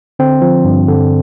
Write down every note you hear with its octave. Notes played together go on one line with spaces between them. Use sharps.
D3 C4
F3
G2
D3